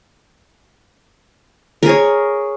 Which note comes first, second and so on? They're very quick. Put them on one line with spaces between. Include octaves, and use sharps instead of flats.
A#4 G#4 C#5